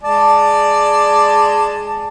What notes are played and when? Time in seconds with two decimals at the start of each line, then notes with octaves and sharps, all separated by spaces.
0.03 G#3 D5 A5